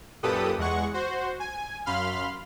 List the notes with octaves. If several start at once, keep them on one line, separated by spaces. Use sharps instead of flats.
F#2 A#2 G4 A4 B4 D#6
E2 G#3 F#5 C#6
F#4 C5
G#5
F#2 F5 B5 C6 F6